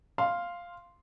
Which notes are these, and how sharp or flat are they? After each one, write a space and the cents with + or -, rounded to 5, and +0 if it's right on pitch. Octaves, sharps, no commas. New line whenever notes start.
F5 +0 C6 +0